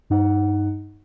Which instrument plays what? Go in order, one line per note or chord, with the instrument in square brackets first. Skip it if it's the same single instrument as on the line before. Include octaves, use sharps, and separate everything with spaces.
[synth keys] G2 D#4 F#5